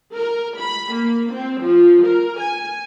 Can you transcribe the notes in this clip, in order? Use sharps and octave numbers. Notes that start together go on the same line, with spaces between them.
A#4
B5
A#3
C4
F3
A#4
G#5